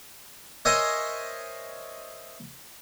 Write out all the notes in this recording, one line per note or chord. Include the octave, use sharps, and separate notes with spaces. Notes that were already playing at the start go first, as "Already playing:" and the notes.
A#4 C5 C#5 D#5 E5 G#5